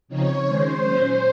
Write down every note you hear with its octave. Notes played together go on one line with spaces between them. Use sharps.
C#3 F3 C4 D#4 C#5
D#3 G#3 C#4 C5
A#2 F#3 C#4